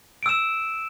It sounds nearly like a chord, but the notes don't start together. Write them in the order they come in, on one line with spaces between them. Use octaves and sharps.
D7 E6 E7